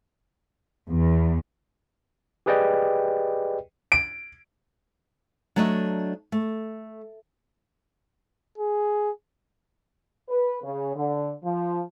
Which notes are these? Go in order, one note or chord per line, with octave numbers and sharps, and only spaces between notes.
E2
G4 G#4 B4 D5 D#5 G5
D7
F#3 A3 D4 D#5 E5
A3
G#4
B4
C#3
D3
F3